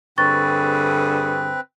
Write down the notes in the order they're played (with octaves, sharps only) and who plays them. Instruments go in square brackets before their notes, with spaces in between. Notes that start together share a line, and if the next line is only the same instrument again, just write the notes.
[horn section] G2 D3 G#4 [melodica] C4 B4 [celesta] C#6 A6